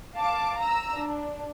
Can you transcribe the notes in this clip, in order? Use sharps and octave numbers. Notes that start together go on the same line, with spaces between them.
F5 A5 D6
A#5 E6
D4